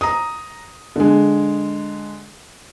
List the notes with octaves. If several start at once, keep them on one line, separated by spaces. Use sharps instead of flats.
A#5 D#6
D3 G#3